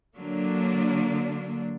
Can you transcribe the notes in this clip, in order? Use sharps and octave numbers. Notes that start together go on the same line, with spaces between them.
D3 F#3 A#3 D4